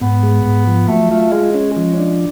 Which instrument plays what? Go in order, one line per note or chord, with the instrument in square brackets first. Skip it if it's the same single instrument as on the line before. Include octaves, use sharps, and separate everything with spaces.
[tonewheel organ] G#2 [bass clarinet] B3
[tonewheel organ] G#3
G#2
F3
[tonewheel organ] F#3 [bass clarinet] A3
[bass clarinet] A3 [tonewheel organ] F4
[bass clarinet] G#3 [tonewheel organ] G#4
[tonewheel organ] C#4
F3
D4